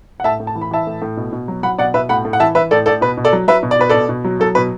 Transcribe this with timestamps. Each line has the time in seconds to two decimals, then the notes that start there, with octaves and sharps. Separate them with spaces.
0.20 F#5
0.24 A2 E5 A5
0.40 A2
0.47 A5
0.55 E3
0.61 B5
0.71 E3 E5 A5
0.87 A2
1.02 A2
1.17 B2
1.32 B2
1.48 F#3
1.63 F#3 F#5 B5
1.78 B2 D5 F#5
1.94 B2 B4 E5
2.09 A2 F#5 B5
2.25 A2
2.33 F#5
2.40 E3 E5 A5
2.55 E3 B4 E5
2.71 A2 A4 D5
2.86 A2 A4 D5
3.01 B2 B4
3.17 B2
3.25 A4 D5
3.33 F#3
3.48 F#3 B4 E5
3.63 B2
3.71 D5
3.79 B2 B4
3.89 B2 A4 D5
4.09 B2
4.24 F#3
4.40 F#3 A4
4.55 B2 B4